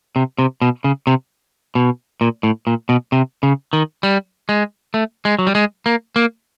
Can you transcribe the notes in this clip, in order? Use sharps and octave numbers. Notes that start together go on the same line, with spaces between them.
C3
C3
B2
C#3
C3
B2
A#2
A2
A#2
B2
C3
C#3
D#3
G3
G#3
A3
G#3
F#3
G3
G#3
A#3
A#3